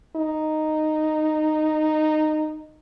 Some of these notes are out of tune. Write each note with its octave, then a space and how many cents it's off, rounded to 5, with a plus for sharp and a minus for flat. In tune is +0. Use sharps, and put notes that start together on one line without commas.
D#4 -10